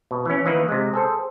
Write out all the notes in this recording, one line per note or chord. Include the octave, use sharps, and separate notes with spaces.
B2
E3 C#4
D#3 E3 A#3 B4
C3 G#3
G#4 A4 C5